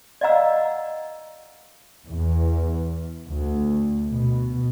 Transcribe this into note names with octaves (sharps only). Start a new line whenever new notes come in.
D5 D#5 F5 F#5 A#5 E6
E2
D2
B2